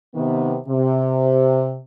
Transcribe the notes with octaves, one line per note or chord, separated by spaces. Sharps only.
C3 D#3 B3
C3